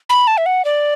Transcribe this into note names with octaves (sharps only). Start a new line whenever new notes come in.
B5
A5
E5
F#5
D5